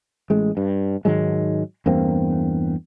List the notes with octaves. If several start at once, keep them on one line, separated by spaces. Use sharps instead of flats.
A1 G#3
G2
G#2 D#3 F#3 G#3
E2 G2 A#3 C4